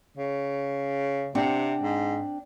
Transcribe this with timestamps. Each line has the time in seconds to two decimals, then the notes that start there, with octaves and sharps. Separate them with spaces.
0.17 C#3
1.35 C3 C4 D4 F#5
1.82 G#2